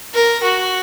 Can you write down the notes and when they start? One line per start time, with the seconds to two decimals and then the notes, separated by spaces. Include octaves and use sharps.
0.15 A#4
0.44 F#4